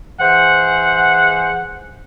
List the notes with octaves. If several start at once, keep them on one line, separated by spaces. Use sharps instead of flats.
E3 G#4 C5 F#5